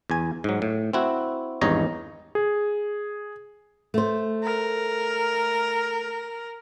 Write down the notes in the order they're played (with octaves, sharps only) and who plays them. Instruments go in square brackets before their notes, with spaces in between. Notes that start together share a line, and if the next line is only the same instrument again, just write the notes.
[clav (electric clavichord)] E2 G#5
G#2 F#3
A2
C4 E4 F#4
G#1 E2 G2 D#4 C#5 A#5
[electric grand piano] G#4
[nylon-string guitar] A3 C5
[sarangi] A#4